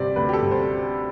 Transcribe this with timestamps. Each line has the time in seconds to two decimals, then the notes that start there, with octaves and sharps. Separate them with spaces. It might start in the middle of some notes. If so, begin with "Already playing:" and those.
Already playing: D2 C3 G3 C4 D5
0.16 D2 B4
0.29 G4
0.33 A4
0.42 C3 G3 C4
0.51 C5